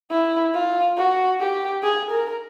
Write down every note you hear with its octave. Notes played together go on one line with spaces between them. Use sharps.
E4
F4
F#4
G4
G#4
A#4